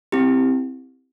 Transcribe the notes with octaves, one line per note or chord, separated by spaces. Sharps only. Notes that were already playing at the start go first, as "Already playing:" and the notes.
C4 E4 G4